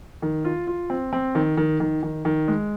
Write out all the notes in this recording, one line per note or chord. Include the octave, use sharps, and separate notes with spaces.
D#3
F4
F4
C4
C4
D#3
D#3
D#3
D#3
D#3
G#3